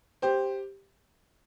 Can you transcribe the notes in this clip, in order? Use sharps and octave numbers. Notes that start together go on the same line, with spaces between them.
G4 C5